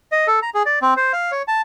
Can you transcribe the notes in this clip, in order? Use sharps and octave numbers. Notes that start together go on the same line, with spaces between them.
D#5
A4
A#5
G#4
D5
C4
C5
F5
C#5
A5